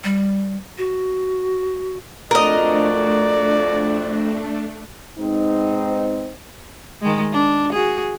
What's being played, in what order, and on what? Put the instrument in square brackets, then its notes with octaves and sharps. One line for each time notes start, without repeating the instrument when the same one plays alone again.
[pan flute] G3
F#4
[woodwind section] F2 F#4 [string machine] A3 D4 [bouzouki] A#4 D#5 [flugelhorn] D5
[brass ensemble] G#2 B2 C4 D#4
[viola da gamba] D#3 G#3
D4
F#4 G#4